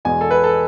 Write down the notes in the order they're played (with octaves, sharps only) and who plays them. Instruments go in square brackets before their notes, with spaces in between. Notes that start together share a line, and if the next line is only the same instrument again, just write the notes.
[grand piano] E2 B2 G#3 G#5
A4
B4
A4